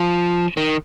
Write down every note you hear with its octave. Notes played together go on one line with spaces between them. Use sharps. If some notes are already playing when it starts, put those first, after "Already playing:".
Already playing: F3
D#3